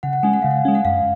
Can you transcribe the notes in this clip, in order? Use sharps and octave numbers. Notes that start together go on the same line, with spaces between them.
C#3 F#5
F#5
G#3 C#4 G#5
F#5
C#3 F5
F#5
G#3 C#4
F#5
F#2 F5